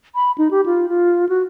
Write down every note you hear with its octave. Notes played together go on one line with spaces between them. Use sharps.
B5
D#4
G4
F4
F4
F#4